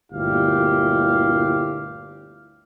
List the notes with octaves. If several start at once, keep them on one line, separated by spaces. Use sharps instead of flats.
G1 D2 A#2 E4 G4 F5